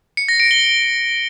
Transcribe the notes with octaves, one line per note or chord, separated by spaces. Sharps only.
C#7
A#6
D7
G7